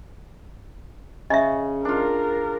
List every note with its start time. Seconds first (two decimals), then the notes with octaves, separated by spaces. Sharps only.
1.30 C#3 C#4 D#5 E5
1.85 D4 F4 A#4